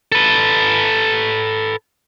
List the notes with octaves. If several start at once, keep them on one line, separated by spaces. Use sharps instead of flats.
A4 B4